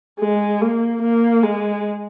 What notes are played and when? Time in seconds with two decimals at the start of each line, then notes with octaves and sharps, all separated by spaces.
0.20 G#3
0.61 A#3
1.03 A#3
1.43 G#3